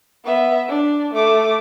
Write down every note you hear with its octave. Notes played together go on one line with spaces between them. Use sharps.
B3 E5
D4
A3 D6